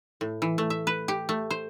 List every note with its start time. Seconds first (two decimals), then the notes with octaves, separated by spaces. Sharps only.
0.21 A2
0.42 E3
0.58 A3
0.70 E5
0.87 B4
1.08 G4
1.29 A3
1.50 C5